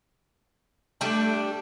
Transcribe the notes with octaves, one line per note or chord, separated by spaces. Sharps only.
G3 A3 D4 A5